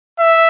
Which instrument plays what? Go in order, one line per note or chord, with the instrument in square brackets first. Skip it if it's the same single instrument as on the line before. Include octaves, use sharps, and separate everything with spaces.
[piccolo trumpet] E5